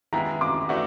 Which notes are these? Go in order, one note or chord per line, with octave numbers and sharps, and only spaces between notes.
D#3 G#3 B3 E4 A#5
D6
E3 A3 D4 F#4